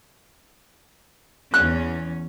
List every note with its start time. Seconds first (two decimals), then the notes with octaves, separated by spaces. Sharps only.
1.54 E2 C#4 F#6